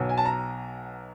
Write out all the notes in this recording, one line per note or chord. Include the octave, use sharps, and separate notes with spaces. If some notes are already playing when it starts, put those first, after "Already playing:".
Already playing: B1 B2 F#3
G#5
A5
A#5